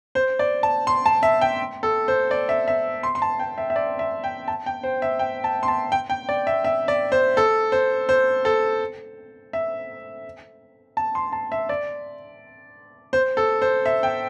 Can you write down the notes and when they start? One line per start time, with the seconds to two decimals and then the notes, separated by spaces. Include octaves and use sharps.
0.15 C5
0.39 D5
0.63 A5
0.87 C6
1.06 A5
1.23 E5
1.41 G5
1.83 A4
2.08 C5
2.31 D5
2.49 E5
2.68 E5
3.03 C6
3.15 C6
3.22 A5
3.39 G5
3.58 E5
3.70 E5
3.76 D5
3.99 E5
4.24 G5
4.48 A5
4.66 G5
4.83 C5
5.02 E5
5.19 G5
5.44 A5
5.63 C6
5.68 A5
5.92 G5
6.10 G5
6.29 D5
6.47 E5
6.64 E5
6.88 D5
7.12 C5
7.37 A4
7.72 C5
8.09 C5
8.45 A4
9.53 E5
10.97 A5
11.15 C6
11.33 A5
11.52 E5
11.69 D5
13.13 C5
13.37 A4
13.62 C5
13.86 E5
14.03 G5